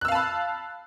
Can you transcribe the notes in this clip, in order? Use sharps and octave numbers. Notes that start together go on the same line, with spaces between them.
F5 A5 B5 E6 F#6